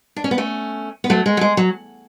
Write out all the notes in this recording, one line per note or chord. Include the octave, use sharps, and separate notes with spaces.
D4
C#4
B3
A3 C#4
B3
F#3 A3
G#3
F#3
G#3
F#3